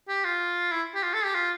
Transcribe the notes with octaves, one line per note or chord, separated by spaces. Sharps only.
G4
F4
E4
G4
F4
A4
G4
F4